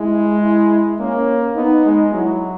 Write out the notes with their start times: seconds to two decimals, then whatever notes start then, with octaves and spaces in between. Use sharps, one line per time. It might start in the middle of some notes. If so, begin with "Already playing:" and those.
Already playing: G#3 E4
0.43 E4
0.99 A#3 C#4
1.56 B3 D#4
1.85 G#3
2.13 F#3 E4